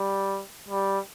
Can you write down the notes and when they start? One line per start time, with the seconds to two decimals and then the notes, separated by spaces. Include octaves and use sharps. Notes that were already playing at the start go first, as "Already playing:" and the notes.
Already playing: G3
0.68 G3